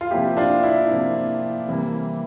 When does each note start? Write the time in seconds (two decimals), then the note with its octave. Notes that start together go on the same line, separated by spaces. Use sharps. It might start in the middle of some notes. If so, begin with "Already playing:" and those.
0.01 F4
0.11 C3 F3 A#3 E4 G4
0.37 D4 F4
0.63 E4
0.89 C3 F3 A#3
1.68 C3 E3 G3 A#3